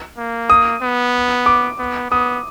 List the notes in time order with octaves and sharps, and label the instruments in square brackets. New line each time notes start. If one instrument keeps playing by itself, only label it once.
[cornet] A#3
[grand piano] D#6
[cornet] B3
[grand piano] D6
[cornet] B3
[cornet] B3 [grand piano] D#6